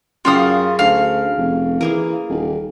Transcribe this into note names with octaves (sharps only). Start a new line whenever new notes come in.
F#2 C#3 F#3 F4 F5 G5 D#6
D2 F5
F1
E3 A#3 G#4 A#4
D#1